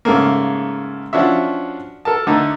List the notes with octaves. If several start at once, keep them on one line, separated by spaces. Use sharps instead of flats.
G#2 C#3 A3 A#3
F3 C#4 D4 F#4 E5
A4 A#4 A5
D3 A3 D#4